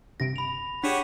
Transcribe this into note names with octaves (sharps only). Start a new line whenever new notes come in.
G2 C3 A#6 D7
B5 F7
D4 G4 G#4 C#5 F#5 B6 D#7 E7